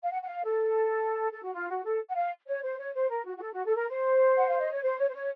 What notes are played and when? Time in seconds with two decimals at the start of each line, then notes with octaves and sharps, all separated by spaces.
0.03 F5
0.11 F#5
0.22 F#5
0.27 F5
0.43 A4
1.32 A4
1.43 F#4
1.53 F4
1.69 F#4
1.84 A4
2.08 F#5
2.15 F5
2.47 C#5
2.62 C5
2.79 C#5
2.94 C5
3.09 A#4
3.26 F#4
3.36 F#4
3.41 A4
3.53 F#4
3.65 A4
3.76 A#4
3.89 C5
4.37 F#5
4.48 F5
4.60 D#5
4.71 C#5
4.82 C5
4.98 C#5
5.08 C5
5.14 C#5